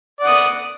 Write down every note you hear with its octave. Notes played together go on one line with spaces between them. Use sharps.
D5 F#5 D#6